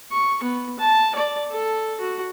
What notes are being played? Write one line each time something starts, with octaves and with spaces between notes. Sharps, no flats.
C#6
B3
A5
D5
A4
F#4